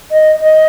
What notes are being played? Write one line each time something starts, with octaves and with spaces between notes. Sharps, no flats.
D#5
D#5